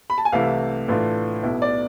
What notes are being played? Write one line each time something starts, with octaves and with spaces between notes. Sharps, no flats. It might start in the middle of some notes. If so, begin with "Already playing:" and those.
B5
A5
G#5
C2 C3 E3 A3 E4 F5
A2 E3 A3 D4 F4
B1 B2 B3 E4
D5